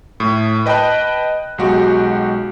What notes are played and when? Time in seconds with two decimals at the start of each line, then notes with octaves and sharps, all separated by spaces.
0.20 A2
0.66 B4 D#5 G5 A5 B5 F#6
1.58 B1 G#3 F#4 G4